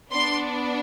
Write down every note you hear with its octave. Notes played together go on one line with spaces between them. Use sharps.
B3 D4 C6